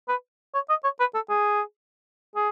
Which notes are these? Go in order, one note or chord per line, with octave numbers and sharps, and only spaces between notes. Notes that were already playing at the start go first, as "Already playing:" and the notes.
B4
C#5
D#5
C#5
B4
A4
G#4
G#4